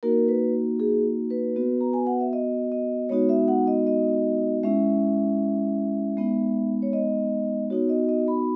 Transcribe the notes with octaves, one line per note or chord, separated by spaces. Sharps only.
A#3 D#4 F#4 A#4
B4
G#4
B4
B3 F#4
A#5
G#5
F#5
E5
D#5
D#5
G#3 B3 D#4 F#4 C#5
E5
F#5
D#5
D#5
G#3 C#4 E4 E5
G#3 B3 D#4
C#5
D#5
B3 D#4 F#4 C#5
D#5
D#5
B5